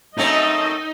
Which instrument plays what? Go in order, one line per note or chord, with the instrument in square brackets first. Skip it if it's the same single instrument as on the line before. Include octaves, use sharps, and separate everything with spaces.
[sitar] F#2 A3 C4 [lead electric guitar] D#4 [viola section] D#5